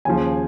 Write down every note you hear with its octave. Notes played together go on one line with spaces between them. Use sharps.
D#2 C#3 F3 G#5